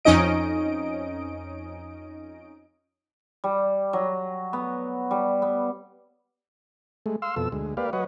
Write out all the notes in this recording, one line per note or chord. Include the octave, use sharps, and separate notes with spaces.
F2 C#4 D#4 D#5 D7
G3
F#3
B3
G3
B3
G#3 A3
F5 C6 E6
F2 B2 A4 E6
D2 G#3
A#3 G4 B4 D5 F5
F#3 B4 C#5 D#5 F#5